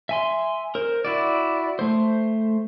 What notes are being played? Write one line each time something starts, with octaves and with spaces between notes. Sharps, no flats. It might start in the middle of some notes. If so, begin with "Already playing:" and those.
E5 G#5 C6
A#4 C5
E4 F#4 D5
A3 C5